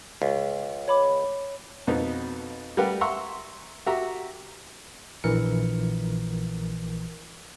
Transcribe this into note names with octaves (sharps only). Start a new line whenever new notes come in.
C#2
C#5 B5 D6
F2 B2 B3 C4 D#4
G3 A3 A#4 B4 F#5 G5
E5 F#5 A#5 C6 C#6 E6
F#4 G4 E5 A#5
A#1 E3 A#4 C#7